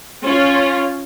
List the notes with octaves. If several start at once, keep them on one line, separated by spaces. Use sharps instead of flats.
C#4 F4